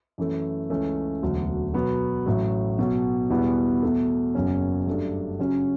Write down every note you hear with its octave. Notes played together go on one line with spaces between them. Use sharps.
F#2 E3 A3
C#2 C#3 E3 A3 C#4
E1 D2 D3 F#3
B2 F#3 B3
A1 A2 F#3
B1 B2 F#3
E2 B2 G3 B3 E4
E2 B2 A3
F#1 E2 C#3 F#3 C#4
G2 F#3 A3 D4
F#2 C#3 F#3 C#4